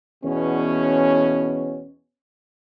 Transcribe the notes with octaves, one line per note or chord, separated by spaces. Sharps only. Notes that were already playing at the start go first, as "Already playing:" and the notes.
E2 B2 C#4